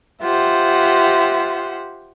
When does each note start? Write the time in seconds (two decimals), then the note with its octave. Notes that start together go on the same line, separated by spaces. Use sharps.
0.23 F4 G4 C5 E5 F#5